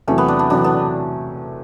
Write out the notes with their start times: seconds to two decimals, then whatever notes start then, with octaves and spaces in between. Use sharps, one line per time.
0.08 E2 C3 F#3 A3
0.18 B3
0.28 D4
0.39 D4
0.50 E2 C3 F#3 D4
0.64 B3